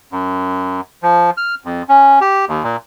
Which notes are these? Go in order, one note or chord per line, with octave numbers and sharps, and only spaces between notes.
F#2
F3
F6
F2
C#4
G4
D#2
A#2